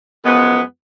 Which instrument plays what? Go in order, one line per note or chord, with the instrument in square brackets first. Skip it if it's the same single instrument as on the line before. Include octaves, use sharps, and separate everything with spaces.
[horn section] F#2 F3 G#3 B3